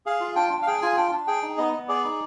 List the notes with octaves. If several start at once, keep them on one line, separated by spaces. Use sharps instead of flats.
G#4 F5
F4
D4 G5
D4
F5
G#4 G5
F4 G#5
D4 G5
D4
G#4 G5
D#4
B3 D#5
B3
G#4 D5
D#4